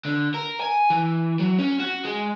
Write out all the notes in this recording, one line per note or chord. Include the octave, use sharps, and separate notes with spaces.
D3
A#4
G#5
E3
F#3
C#4
F#4
G#3